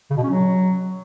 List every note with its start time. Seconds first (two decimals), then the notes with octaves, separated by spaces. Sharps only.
0.10 C#3
0.17 B2
0.23 C#4
0.30 F#3